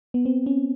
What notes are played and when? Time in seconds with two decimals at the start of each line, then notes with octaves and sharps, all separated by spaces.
0.14 B3
0.25 C4
0.46 C#4